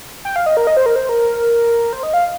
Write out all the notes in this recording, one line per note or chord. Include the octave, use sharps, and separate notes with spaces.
G5
F5
D#5
A#4
D#5
C5
A#4
C5
A#4
C5
D#5
F5